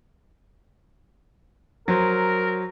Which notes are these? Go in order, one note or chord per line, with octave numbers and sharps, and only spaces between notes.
F#3 A#4 C5